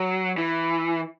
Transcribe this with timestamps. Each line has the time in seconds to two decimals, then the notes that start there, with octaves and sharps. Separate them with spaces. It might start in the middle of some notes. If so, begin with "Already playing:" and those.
Already playing: F#3
0.38 E3